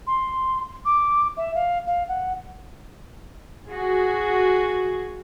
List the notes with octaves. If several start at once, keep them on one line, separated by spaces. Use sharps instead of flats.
C6
D6
E5
F5
F5
F#5
F#4 G#4